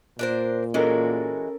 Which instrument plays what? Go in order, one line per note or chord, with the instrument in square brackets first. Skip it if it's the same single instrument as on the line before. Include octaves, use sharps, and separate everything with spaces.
[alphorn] A#2 [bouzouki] D4 A#4 C5
[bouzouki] E3 G#3 F#4 [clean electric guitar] C#4 A4 A#4